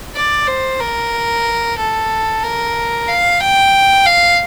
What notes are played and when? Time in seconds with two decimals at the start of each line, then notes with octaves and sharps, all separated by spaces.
0.15 D5
0.47 C5
0.80 A#4
1.78 A4
2.43 A#4
3.08 F5
3.41 G5
4.06 F5